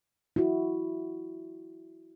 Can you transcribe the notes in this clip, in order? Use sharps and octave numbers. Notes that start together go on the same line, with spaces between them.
E4 F#4